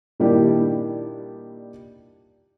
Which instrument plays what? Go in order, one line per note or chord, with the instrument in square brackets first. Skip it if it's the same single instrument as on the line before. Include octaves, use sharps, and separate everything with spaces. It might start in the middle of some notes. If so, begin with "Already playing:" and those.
[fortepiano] A#2 D#3 G3 D4 E4 G4